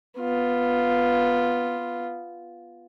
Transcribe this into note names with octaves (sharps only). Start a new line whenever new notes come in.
B3 F4